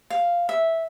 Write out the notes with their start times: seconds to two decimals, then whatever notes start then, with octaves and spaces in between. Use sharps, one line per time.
0.10 F5
0.49 E5